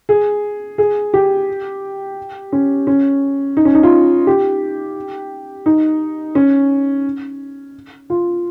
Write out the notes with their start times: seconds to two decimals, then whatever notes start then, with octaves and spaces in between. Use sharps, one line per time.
0.09 G#4
0.78 G#4
1.14 G4
2.52 C#4
2.87 C#4
3.57 D#4
3.65 C#4
3.75 D#4
3.83 F4
4.27 G4
5.66 D#4
6.35 C#4
8.10 F4